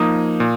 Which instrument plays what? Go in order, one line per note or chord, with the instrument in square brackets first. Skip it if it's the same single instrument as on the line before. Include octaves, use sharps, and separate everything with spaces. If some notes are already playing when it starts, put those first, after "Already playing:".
Already playing: [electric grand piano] F3 A#3 D#4 D#6
A#2